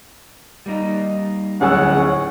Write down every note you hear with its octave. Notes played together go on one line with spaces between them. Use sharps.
G3 A#3 D#4
D1 C#4 G#4 F#5 E6